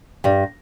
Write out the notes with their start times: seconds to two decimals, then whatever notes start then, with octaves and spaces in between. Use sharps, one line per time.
0.24 G2 G3